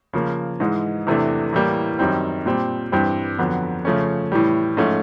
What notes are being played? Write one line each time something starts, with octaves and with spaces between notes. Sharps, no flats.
C#3 F3 A#3
G#2 E3 G#3
E2 C3 E3 A3 D4
A2 E3 G3 A#3
F#2 D#3 G3 C4
A#2 G3 C4
G2 E3 G3 C4
F2 D3 F#3 B3
C#3 F3 A3 C#4
A2 E3 G3
G#2 F3 A3 C#4